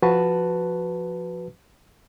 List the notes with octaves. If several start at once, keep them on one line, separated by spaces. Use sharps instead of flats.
F3 F#4 B4 A5